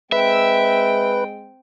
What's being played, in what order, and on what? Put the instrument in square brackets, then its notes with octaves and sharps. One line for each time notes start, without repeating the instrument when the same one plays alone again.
[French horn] G#3 [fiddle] C4 G5 [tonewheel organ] B4 [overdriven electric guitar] E5